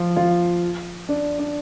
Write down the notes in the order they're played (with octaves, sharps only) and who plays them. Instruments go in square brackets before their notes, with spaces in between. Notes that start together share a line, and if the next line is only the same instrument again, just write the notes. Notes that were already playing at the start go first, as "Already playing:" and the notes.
Already playing: [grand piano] F3 F4
F3 F4
D4
D4